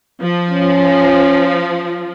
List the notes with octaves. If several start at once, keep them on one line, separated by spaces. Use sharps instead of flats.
F3
C#4